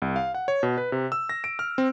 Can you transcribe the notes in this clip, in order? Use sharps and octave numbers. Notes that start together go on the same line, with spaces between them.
C2
F5
F#5
C#5
B2
B4
C3
E6
A#6
D7
F6
C4